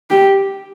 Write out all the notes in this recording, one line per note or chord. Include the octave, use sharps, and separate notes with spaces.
G4